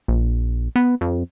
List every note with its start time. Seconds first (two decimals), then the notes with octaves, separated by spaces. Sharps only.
0.08 A#1
0.76 B3
1.01 F2